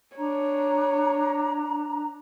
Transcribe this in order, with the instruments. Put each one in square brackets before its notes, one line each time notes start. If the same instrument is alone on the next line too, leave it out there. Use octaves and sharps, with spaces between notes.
[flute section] D4 A#5 [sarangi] C#5